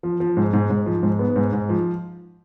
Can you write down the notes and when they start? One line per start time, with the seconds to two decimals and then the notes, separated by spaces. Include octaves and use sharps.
0.03 F3
0.20 F3
0.37 G#2
0.53 G#2
0.70 G#2
0.86 F3
1.03 G#2
1.19 B3
1.36 G#2
1.53 G#2
1.69 F3